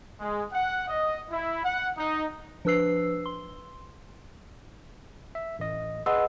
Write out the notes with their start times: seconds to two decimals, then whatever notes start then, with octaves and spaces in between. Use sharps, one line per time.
0.21 G#3
0.52 F#5
0.88 D#5
1.30 E4
1.64 F#5
1.98 D#4
2.65 F3 D4 B4 E6 C7
3.26 C6
5.35 E5
5.59 A1 D#5
6.06 G#4 B4 D#5 F#5 C6 E6